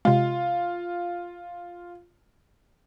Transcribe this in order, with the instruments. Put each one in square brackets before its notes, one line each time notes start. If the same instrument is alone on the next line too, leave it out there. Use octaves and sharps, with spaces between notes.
[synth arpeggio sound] C3 G#3 [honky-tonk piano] F4